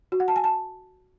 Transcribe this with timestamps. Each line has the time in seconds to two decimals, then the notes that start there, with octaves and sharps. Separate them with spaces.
0.12 F#4
0.20 F#5
0.28 A5
0.36 G#5
0.44 A5